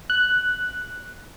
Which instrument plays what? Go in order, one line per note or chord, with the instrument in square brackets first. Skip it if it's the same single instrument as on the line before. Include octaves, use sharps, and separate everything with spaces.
[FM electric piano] F#6